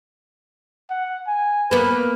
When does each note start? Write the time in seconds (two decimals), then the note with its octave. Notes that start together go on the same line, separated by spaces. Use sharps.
0.90 F#5
1.27 G#5
1.71 A#3 B3 B4